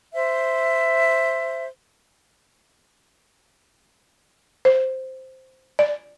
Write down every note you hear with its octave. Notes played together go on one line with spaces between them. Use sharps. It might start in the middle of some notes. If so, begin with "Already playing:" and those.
C5 E5
C5
D5